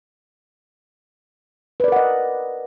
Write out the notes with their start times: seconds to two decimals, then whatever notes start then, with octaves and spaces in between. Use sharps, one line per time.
1.80 B4
1.84 D5
1.88 A#4
1.92 F#5
1.96 D#5